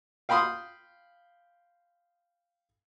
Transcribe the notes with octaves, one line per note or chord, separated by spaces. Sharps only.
F5 G5 B5 C6 D#6